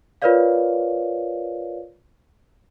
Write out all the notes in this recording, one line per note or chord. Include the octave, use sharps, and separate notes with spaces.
F4 A#4 B4 C#5 D5 F5